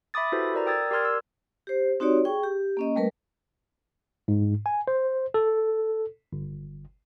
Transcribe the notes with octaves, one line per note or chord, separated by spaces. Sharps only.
E5 B5 D6 D#6 A6
E4 F#4 G4 A4 B4 C5
A#4 D5 A#5
G5 D#6 E6 G#6 A6
G4 A#4 D5 C6 F6 G#6
E6
G4 C5
C4 D#4 F#4 G4 C#5 D5
G#4 G5 C#6
G4
A#3 C#4 D#5
G3 A3 A#4 B4
G#2
G#5
C5
A4
G1